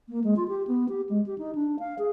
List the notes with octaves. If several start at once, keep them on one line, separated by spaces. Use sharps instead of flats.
A#3
G#3
F4
G4
B3
G4
G#3
G4
D#4
D4
F5
G#4